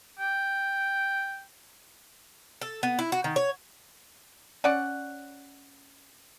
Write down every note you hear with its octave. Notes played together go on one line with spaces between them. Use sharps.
G5
A4
B3
E4
F#4
D#3
C#5
C#4 C#5 D5 F#5